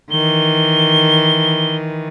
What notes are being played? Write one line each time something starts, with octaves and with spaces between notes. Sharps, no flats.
D#3 E3 G7